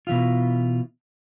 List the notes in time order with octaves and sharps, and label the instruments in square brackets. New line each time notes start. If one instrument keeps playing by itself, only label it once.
[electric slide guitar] B2 E3 F4